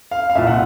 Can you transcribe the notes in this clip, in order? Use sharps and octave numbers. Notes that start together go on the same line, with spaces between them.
F5
F5
C2 A#2 E5
F#5